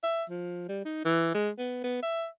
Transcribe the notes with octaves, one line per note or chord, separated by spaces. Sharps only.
E5
F3
G3
D#4
E3
G#3
B3
B3
E5